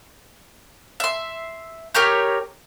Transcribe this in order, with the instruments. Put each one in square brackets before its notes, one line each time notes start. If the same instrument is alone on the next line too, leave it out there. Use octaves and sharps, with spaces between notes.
[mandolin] E5 C6
G4 A#4 C#5 G6